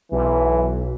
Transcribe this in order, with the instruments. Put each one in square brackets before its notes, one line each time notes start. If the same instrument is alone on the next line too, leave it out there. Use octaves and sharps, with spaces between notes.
[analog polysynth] B1 [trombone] E3